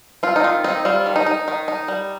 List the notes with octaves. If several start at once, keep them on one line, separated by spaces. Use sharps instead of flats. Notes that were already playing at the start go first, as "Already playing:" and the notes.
C4 F4
D#4
D#3 F4
C4 D#4
G3 F4
D#3
D#4
D#4
D#3
D#4
G3